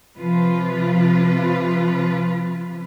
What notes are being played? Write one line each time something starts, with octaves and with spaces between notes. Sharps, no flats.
C3 F3 F4 B4